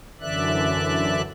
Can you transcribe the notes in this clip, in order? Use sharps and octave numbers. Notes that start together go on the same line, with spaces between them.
F#2 D3 E3 D5 E5 F#6